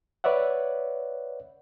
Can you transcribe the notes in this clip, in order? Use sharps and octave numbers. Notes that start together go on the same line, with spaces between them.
B4 C#5 D5 E5 F#5